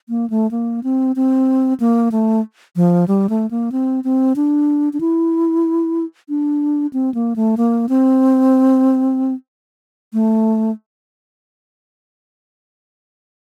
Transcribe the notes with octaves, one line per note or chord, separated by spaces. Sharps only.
A#3
A3
A#3
C4
C4
A#3
A3
F3
G3
A3
A#3
C4
C4
D4
D4
E4
D4
C4
A#3
A3
A#3
C4
A3